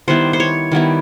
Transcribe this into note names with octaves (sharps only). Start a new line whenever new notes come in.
D#3 G3 B3 E4 C5
C5
C#5
D#3 G3 B3 E4